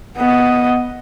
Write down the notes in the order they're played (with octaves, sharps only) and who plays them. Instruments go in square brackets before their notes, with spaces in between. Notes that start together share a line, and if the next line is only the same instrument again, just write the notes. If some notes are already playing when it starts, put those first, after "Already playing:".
[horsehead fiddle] B3 D#5